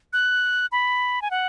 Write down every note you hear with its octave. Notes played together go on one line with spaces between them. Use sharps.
F#6
B5
G#5
F#5